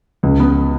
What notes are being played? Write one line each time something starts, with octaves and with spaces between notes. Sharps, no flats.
C#2
B3